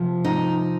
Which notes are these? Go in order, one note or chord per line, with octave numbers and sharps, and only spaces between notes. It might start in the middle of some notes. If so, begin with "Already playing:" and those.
Already playing: C3 F3
D#4